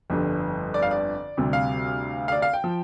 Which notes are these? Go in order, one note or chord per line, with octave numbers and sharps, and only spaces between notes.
G1 F2 D3 G3
D5
F5
D5
D2 C3 G3
F5
F5
D5
F5
G5
F3